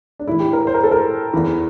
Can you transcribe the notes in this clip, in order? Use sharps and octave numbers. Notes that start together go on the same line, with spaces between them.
D4
A2 E3 E4
G4
A#4
C5
A#4
A4
A#4
E2 E3